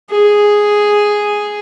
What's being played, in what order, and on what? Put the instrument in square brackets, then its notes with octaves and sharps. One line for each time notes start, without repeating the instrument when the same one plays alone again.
[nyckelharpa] G#4